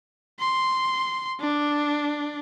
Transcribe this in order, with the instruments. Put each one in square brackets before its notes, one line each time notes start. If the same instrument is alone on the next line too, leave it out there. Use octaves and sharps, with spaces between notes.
[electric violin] C6
D4